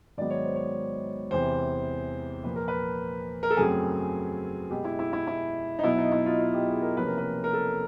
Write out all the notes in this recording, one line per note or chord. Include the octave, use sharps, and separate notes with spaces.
G#2 D#3 F#3 B3 D5
C#5
C5
C#5
E2 C3 E3 C5
A#2 F3 A#3 B4
A#4
B4
A#4
A4
F#2 C#3 F#3 A3 C4 G#4
B2 G#3 B3 G4
E4
E4
E4
E4
D#4
B2 F#3 B3 E4
D#4
E4
F4
F4
G4
G#4
A#4
C3 F3 A#3 C#4 B4
A#4
B4
A#4
A4